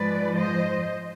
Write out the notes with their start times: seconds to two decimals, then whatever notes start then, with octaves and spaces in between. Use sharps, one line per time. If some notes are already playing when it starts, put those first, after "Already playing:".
Already playing: G#2 F3 G#3 B4 D5
0.36 C5 D#5